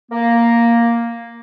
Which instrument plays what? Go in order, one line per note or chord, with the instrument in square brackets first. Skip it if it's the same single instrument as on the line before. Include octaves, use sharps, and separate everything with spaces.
[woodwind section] A#3